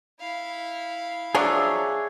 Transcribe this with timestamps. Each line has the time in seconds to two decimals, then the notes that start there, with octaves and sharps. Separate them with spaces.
0.20 E4 F5
1.35 F3 F#3 D4 G#4 C#5 E5